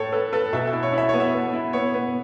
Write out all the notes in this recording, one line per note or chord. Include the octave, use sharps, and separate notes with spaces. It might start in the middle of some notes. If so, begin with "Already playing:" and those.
Already playing: A2 A4 C#5
A4 B4
A4 B4
B2 E5
E5
E4
C#5
E4
E5
B3 C#5
E5
B3
E4
B3 C#5
B3